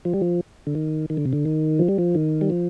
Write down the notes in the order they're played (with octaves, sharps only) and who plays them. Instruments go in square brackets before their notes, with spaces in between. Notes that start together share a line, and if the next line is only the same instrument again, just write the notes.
[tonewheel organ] F3
G3
F3
D3
D#3
D#3
D3
C3
D3
D#3
F3
G3
F3
D#3
G3
F3